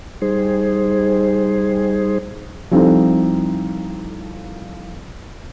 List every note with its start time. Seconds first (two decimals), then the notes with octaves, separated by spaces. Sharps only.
0.22 G3 D#4 G#4 C5
2.71 F3 G3 C4 D#4 E4 A4